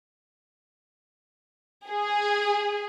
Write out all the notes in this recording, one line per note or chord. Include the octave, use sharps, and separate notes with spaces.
G#4